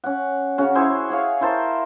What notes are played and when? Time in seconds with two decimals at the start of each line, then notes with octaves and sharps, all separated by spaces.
0.04 C#4 F#5
0.58 C#3 C#4 F#4
0.75 E4 G#4 C5 C#5
1.10 G#4 C#5 F5
1.41 E4 A#4 C5 A5